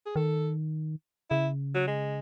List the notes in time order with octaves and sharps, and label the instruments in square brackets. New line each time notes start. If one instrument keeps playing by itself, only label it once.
[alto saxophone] G#4
[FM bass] D#3 [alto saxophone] A4
[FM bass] C#3 [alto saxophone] E4
[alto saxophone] F#3
G#3